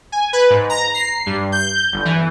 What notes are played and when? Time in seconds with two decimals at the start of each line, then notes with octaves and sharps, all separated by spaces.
0.12 G#5
0.33 B4
0.50 G#2
0.70 A#5
0.94 C7
1.26 G2
1.52 G6
1.93 G1
2.05 E3